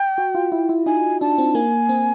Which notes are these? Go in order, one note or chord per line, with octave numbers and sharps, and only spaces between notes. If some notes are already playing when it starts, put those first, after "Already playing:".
Already playing: G5
F#4
F4
E4
E4
D#4 G#5
D4 A5
C4
A#3 G#5
C4